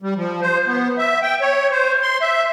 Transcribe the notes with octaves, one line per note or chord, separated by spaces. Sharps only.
G3
F3
C5
B3
E5
G5
C#5
C5
C6
E5